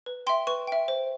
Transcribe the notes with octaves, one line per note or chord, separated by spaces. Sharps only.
B4
E5 G5 C6
B4 C#6
E5 G5
C5